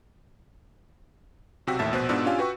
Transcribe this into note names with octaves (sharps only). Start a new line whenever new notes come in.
B1 C3 F#4 G5 E6 B6
A1 D#2 A2 E5 A5 A6
A#1 B2 C5 F#6
G#2 B2 B3 D4 F4 E6
C#4 D4 F4 G4 F5 G#5
F#4 B4 G5 C#6